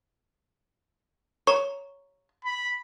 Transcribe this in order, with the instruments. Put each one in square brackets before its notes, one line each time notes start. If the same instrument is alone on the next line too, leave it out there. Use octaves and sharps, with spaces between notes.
[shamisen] C#5 [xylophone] A#5 C#6
[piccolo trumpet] B5